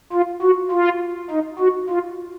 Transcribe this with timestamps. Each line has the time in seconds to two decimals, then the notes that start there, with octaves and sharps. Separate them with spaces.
0.12 F4
0.42 F#4
0.71 F4
1.30 D#4
1.59 F#4
1.90 F4